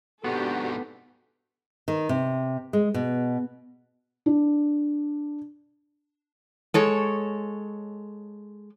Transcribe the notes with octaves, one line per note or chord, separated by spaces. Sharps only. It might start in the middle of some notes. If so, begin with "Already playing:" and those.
G#2 C3 B3 D4 F#4 G4 A4
D#3
C3
G#3
B2
D4
G#3 A4 C#5